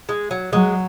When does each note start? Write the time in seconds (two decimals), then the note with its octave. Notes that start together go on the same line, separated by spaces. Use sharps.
0.09 G#3
0.31 F#3
0.53 F#3 G#3